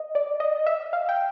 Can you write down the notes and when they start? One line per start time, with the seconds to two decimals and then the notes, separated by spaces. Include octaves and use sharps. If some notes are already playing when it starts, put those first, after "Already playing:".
Already playing: D#5
0.15 D5
0.40 D#5
0.66 E5
0.93 F5
1.09 G5